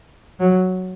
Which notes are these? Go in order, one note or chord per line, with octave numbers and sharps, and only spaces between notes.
F#3